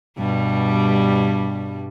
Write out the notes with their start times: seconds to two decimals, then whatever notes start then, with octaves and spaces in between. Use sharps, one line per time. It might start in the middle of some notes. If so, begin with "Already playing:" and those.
0.18 G2 B2 G3